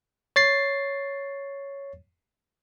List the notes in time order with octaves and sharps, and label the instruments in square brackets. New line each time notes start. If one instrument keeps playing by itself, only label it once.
[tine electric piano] C#5 A6 C7